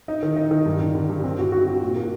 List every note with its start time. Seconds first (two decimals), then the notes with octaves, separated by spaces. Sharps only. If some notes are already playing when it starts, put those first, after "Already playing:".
0.08 D#4
0.23 D#3
0.36 D#4
0.51 D#3
0.66 G2
0.80 D3
0.95 D3
1.10 G2
1.24 C4
1.39 F#4
1.52 F#4
1.66 F#4
1.81 A#2
1.96 A#3